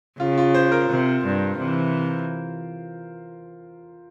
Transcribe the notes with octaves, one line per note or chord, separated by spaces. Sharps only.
C#3 F4
F4
C5
A#4
C3
G2
C3 E3